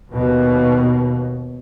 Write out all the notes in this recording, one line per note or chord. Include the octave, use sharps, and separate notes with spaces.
D#2 B2